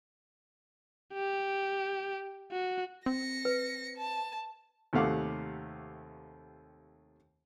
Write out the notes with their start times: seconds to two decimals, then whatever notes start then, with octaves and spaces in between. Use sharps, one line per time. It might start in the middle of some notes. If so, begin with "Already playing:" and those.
1.14 G4
2.52 F#4
3.06 C4 A#6 C#7
3.45 B4
3.97 A5
4.93 D#2 C3 A3 F5 F#5 D6